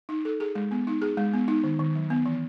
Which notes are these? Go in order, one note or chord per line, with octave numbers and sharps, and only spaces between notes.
D#4
A4
G#4
G#3
B3
D#4
G#4
G#3
B3
D#4
D#3
D#3
F#3
B3
E3